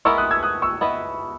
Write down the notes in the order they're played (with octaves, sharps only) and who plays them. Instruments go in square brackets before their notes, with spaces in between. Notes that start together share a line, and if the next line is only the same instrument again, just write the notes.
[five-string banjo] G#3 B3 E4 A#4 [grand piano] C#6 E6
[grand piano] D#6 F#6
E6 G#6
D#6 F#6
C#6 E6
[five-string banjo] B3 E4 B4 D#5